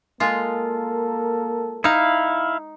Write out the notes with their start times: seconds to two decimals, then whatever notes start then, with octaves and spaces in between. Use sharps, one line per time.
0.20 G#3 A#3 F4 A4 A#4
1.84 D#4 E4 F5